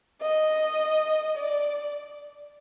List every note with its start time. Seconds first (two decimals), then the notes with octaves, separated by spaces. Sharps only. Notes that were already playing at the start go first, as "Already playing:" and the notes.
0.22 D#5
1.36 D5